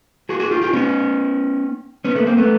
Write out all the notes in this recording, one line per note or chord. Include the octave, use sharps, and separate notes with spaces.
F#4 G#4
F#4 G#4
F4 G4
F4 G4
B3 C#4
B3 C#4
A3 B3
A#3 C4
A3 B3